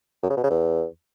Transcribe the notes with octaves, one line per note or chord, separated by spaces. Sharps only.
F#2
C#3
B2
C#3
E2